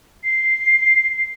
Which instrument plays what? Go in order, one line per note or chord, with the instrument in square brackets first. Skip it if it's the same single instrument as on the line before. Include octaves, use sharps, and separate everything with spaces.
[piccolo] C7